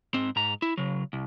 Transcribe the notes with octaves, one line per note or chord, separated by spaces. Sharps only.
G#2 C4
G#2 A#5
E4
C#3 F#3
C2